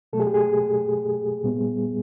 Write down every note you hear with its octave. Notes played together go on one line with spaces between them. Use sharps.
B2 F#3 A3 A4
G#4
G4
G#4
A#2 G3 B3